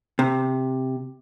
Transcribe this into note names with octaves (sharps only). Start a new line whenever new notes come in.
C3